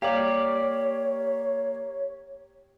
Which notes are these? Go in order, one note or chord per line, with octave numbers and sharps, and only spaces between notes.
A#3 G4 C#5 D5 F5 G#6